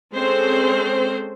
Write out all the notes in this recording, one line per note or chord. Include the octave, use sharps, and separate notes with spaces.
G#3 C4 C#4 A4 C5